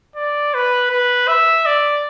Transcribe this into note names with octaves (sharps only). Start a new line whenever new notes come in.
D5
B4
B4
E5
D5